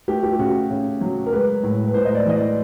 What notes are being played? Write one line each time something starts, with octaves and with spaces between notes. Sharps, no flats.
A3 G4
G4
G4
C#3 F#4
C#3
F#3
A#4
G#3 B4
A2
B4
A2 C5
D#5
D5
E3 D#5
D5